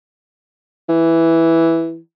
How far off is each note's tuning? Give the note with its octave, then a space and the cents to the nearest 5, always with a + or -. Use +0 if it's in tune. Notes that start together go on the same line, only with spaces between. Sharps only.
E3 +0